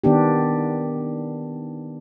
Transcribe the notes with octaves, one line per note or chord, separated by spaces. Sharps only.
D#3 B3 D4 G4